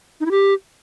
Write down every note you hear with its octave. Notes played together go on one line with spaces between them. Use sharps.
D#4
E4
G4